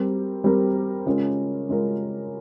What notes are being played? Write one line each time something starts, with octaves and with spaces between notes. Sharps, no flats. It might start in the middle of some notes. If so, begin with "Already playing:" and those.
Already playing: G3 C4 G4 A#4
G3 C4 G4 A#4
C#3 G#3 C#4 F4 A#4
C#3 G#3 C#4 F4 A#4